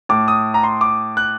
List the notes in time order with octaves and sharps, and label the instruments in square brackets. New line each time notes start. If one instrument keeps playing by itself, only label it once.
[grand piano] A2 D6
D#6
A#5
C6
D6
F#6